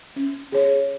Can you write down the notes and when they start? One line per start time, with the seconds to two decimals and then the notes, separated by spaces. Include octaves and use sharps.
0.16 C#4
0.52 G#4 C#5